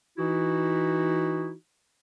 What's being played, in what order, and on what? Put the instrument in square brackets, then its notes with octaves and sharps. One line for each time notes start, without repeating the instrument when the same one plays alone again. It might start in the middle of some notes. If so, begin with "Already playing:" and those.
[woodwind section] E3 D#4 E4 F#4